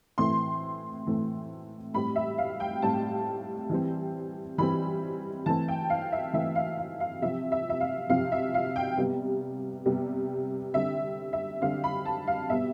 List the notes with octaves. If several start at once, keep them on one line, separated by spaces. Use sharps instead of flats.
A2 E3 A3 C4 C6
A2 E3 A3 C4
A2 G3 C4 B5
E5
F5
G5
A2 G3 C4 A5
E3 G3 C4
E3 G3 C4 B5
E3 A3 C4 A5
G5
F5
E5
E3 A3 C4 E5
F5
F5
F5
C3 F3 C4 E5
E5
E5
F5
C3 F3 C4 F5
E5
F5
G5
C3 G3 B3
C3 G3 B3
D3 G3 C4 E5
E5
D3 G3 C4 F5
B5
A5
F5
B2 G3 B3 E5